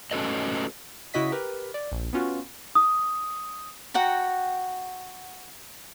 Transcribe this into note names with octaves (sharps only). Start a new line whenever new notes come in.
A3 C#4 F#4 A4 B4 D#5
C#3 E4 F#4 D#5 B6
G4 A#4 B4
D5
A#1
B3 C#4 F4 F#4
D#6
F#4 F#5 G5 A#5